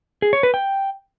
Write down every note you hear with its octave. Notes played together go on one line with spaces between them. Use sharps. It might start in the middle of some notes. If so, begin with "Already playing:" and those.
G#4
C#5
B4
G5